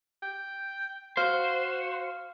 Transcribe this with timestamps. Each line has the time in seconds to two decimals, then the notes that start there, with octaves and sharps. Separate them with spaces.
0.23 G5
1.17 F#4 C5 F5